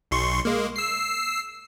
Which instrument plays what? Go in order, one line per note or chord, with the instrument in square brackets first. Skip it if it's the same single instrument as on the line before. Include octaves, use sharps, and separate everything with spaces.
[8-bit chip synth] B1 C6 C#6
G#3 A#3
E6 C7